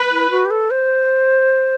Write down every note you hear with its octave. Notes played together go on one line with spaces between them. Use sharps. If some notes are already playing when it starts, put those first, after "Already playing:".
Already playing: B4
E4
F#4
G4
A4
C5